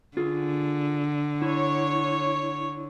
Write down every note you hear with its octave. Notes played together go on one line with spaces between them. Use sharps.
D3 F4 G#4
E4 C#5